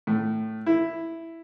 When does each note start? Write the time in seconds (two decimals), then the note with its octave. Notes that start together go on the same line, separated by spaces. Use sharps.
0.07 A2
0.66 E4